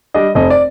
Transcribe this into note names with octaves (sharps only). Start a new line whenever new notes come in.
G3 D4 D#5
F1 D#5
D5